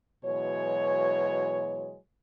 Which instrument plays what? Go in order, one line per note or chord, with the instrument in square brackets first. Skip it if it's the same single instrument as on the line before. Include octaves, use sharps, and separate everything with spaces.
[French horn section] B2 E3 F#3 G#3 C#5